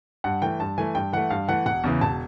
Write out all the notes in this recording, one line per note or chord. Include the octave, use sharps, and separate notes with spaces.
G2 F#5
E3 A3 G5
G2 A5
E3 A3 G#5
G2 G5
E3 A3 F#5
G2 F5
E3 A3 F#5
E1 F#5
E2 C#3 E3
E1 A5